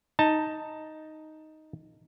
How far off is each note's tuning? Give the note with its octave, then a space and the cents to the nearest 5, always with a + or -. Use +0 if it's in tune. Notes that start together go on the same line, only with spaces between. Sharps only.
D#4 +5 A5 +15